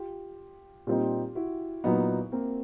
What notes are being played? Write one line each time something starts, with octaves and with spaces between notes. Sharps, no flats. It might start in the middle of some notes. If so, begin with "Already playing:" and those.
Already playing: F4 G4
A#2 G3 C4 D#4 F4 G4
E4 F#4
A#2 F#3 B3 D#4
A#3 C4